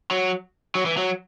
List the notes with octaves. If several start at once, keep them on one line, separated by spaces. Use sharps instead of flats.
F#3
F#3
E3
F#3